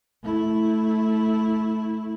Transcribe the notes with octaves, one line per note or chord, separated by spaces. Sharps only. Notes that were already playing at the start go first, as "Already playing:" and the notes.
A3 E4